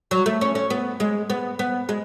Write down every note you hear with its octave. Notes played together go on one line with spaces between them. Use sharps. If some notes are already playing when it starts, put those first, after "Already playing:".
F#3
A3
C#4
C#4
B3
G#3
B3
B3
G#3